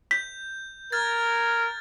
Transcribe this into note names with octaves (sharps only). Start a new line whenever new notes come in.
G6 B6
A#4 F6 G#6 A6